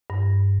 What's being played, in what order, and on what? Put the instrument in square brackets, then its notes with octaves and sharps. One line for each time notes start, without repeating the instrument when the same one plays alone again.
[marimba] G2